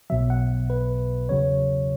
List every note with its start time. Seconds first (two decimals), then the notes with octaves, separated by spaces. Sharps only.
0.10 B1 B2 F#3 E5
0.30 F#5
0.70 B4
1.29 E2 C#3 F#3 C#5